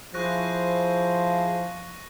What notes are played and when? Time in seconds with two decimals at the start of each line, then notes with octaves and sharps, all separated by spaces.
0.14 F3 E4 G#4 C5 C#6 F#6 A#6